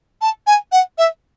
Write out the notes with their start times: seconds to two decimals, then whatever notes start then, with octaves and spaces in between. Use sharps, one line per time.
0.21 A5
0.47 G#5
0.72 F#5
0.98 E5